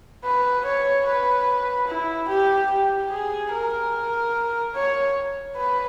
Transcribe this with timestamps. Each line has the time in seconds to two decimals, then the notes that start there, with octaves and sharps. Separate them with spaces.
0.24 B4
0.65 C#5
1.06 B4
1.88 E4
2.29 G4
2.71 G4
3.10 G#4
3.52 A#4
4.75 C#5
5.57 B4